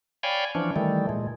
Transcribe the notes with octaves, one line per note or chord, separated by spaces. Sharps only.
C#5 D5 F5 G5 G#5 B5
E3 F3 C#4 D4
D#3 E3 G3 A3
A#2 G#3